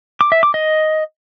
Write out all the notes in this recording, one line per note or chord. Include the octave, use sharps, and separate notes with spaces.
D6
E5
D6
D#5